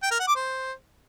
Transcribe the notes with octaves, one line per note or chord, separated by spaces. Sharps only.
G5
A#4
F#5
D6
C5